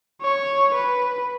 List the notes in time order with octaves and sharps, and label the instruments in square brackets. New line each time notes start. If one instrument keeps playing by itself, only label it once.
[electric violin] C#5
B4